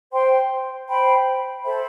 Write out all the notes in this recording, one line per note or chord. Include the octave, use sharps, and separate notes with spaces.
C5 G5 C6
C5 G5 B5
A4 C5 E5 B5